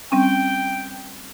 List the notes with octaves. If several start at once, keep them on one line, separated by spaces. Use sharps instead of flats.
G3 C4 C#4 G5